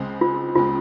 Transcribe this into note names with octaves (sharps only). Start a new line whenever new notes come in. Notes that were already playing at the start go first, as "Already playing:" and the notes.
Already playing: C#2 C#3 G#3 C4
F4
C#2 C#3 G#3 C4 F4